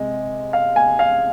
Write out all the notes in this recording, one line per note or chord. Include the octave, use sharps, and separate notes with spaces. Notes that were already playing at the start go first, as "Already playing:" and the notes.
Already playing: C3 G#3
F5
G#5
F5